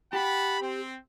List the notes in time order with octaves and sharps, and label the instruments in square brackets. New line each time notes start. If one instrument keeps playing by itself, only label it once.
[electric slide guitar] G4 [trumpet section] F#5 A5 B5
[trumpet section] C4